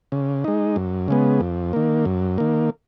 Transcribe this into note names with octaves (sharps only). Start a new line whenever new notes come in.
C#3
G#3 D#4
F#2
C#3 G#3 B3
F2
D#3 A#3
F#2
D#3 A#3